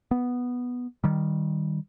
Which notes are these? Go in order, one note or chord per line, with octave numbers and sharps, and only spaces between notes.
B3
D#3 G3